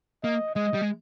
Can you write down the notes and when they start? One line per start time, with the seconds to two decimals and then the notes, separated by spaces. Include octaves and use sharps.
0.24 A#3 D#5
0.55 G#3 D#5
0.74 G3
0.81 G#3